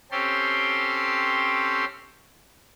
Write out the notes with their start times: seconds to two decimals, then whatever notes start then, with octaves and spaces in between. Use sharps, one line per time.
0.11 C4 C#4 G4 A4 C6